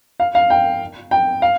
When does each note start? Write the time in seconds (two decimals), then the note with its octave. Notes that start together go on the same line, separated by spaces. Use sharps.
0.20 F5
0.35 F5
0.50 G5
1.11 G5
1.42 F5